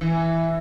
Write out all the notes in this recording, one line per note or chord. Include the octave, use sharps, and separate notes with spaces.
E3